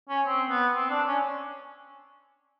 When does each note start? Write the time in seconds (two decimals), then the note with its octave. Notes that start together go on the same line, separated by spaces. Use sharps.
0.09 C#4
0.26 C4
0.50 B3
0.75 C4
0.90 D4
1.07 C#4